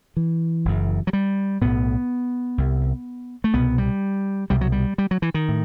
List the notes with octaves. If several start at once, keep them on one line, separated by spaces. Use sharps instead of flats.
E3
F#1 F#2
F#3
G3
B1 A2 B3
C2 C3
A3
C2 B2 B3
G3
C2 B2 G3
F#3
G3
G3
F#3
E3
D#3
A2